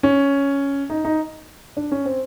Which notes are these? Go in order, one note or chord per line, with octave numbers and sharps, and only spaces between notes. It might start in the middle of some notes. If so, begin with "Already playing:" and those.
C#4
D#4
D#4
D4
C#4
C4